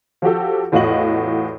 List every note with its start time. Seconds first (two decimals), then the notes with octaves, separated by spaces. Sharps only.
0.22 F3 F#4 G4 A4
0.72 E2 A2 F4 F#4 D#5 F#7